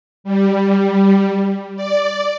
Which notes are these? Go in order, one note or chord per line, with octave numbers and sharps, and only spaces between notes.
G3
D5